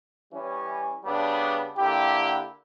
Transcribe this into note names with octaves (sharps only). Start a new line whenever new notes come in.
E3 G3 C#4
C#3 G3 B3 D4
D3 A#3 E4 G4